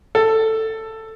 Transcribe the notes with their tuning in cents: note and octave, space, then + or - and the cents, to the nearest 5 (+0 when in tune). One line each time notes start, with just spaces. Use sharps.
A4 +10